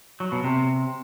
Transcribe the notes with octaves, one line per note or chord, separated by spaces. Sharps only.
F#3
B2
C3